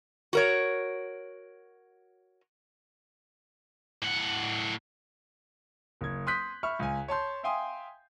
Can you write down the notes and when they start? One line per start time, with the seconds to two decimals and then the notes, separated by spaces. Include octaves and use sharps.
0.33 F#4 A#4 C#5
4.02 A2 F#5
6.01 F#1 G#6
6.27 C6 D#6 F#6 G6 B6
6.63 E5 B5 C#6 F6
6.79 C#2 G#5
7.08 C#5 A5 C6 G6
7.43 E5 F5 G5 G#5 C6 D#6